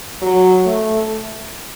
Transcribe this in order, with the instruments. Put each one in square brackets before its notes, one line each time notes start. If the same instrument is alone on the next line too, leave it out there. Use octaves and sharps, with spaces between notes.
[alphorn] F#3
A3